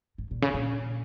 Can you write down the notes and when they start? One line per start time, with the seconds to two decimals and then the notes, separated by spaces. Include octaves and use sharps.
0.18 G#2
0.31 A#2
0.42 C#3
0.54 A#2